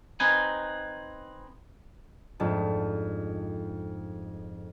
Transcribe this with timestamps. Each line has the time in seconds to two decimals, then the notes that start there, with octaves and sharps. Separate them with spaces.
0.20 C4 D#4 B4 G#5
2.40 F2 G#2 G#3 A3 D4 D#4